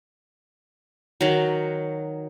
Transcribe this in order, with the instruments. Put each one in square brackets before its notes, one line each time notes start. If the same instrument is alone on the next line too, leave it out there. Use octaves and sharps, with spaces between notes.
[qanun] D#3 F#3